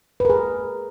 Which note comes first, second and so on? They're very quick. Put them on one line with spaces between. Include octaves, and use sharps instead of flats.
B4 A#4 G#4